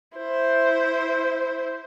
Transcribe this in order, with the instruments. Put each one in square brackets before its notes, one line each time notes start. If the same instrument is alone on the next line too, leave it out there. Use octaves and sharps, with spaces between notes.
[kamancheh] E4 C5